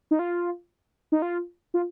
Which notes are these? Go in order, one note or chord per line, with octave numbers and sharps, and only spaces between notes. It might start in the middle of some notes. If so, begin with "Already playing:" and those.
D#4
F4
D#4
F4
F4